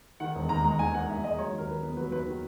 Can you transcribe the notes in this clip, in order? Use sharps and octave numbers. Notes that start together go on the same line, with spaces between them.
D#3 F#5
E1
D#2 A#5
G#3 A#5
D#3 G#5
E1 F#5
D#2 E5
G#3 D#5
F#3 C#5
D#2
A#4
D#3 B4
B3 B4
F#3 B4
D#2 B4
D#3